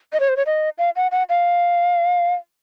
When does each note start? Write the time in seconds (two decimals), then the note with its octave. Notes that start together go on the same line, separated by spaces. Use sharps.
0.13 D#5
0.20 C#5
0.29 C5
0.37 C#5
0.46 D#5
0.78 F5
0.96 F#5
1.12 F#5
1.29 F5